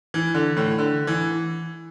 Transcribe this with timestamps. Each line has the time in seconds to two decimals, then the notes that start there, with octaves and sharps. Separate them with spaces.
0.14 E3
0.34 D3
0.57 A2
0.78 D3
1.07 E3